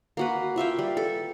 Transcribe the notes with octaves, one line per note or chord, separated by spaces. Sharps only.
A#3 F#4 B4
F4 E5 F5 G5
G3
A4